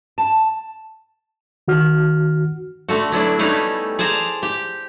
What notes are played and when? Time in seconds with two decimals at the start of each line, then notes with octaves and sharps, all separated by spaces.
0.18 A5
1.68 D#3 F#4 F6
2.89 D3 A3 F#4
3.12 F#3 B3 D4 E4
3.39 G3 A3 C#4 D#4 E4
3.99 G#4 C5 D5 A5 A#5
4.43 G4